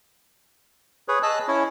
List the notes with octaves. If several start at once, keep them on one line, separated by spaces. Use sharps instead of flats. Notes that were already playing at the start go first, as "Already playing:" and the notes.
G#4 B4 C#5
G#4 D#5 A5 E6 F#6
C#4 E4 C#5